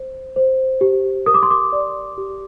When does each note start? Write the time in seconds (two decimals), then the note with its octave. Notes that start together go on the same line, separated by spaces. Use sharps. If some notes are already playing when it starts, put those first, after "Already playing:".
Already playing: C5
0.36 C5
0.81 G4
1.26 A#4 D#6
1.34 D6
1.43 C6
1.51 D6
1.72 D5
2.18 G4